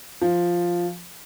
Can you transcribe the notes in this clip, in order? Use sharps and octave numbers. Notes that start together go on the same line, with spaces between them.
F3